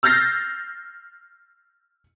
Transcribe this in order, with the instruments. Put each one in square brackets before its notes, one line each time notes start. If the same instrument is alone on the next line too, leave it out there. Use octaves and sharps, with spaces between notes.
[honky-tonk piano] E6 F6 G6 A6 A#6 C7